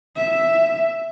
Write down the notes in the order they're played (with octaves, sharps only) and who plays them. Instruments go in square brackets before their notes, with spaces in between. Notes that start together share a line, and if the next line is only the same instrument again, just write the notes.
[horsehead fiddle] E5